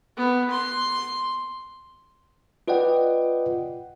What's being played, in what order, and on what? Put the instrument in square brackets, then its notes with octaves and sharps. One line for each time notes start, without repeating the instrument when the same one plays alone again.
[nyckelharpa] B3
C6
[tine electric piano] F4 B4 D5 D#5 F#5 G5